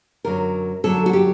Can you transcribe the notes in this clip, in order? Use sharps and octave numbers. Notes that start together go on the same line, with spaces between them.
F#2 D3 F#3 A#4
F#2 D3 F#3 A4
F#4
G4